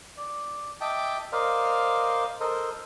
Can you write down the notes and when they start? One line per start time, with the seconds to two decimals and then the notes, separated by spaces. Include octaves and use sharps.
0.17 D5
0.81 D#5 E5 G5 A5 D6
1.32 A#4 C5 D5 D#5 F5
2.40 A4 A#4 C5 D#5